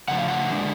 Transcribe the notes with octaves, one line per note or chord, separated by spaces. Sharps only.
C#3 F3 A3 D4 F#5
F5
F#5
D3 G#3 D4